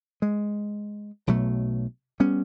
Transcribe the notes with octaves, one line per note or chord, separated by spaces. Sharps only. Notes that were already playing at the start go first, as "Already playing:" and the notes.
G#3
B1 B2 F#3 A3
G3 B3 C#4